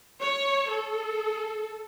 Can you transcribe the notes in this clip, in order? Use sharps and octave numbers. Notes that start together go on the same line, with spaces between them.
C#5
A4